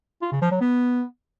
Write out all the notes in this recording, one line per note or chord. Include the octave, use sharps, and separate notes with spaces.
F4
C#3
F3
F#3
B3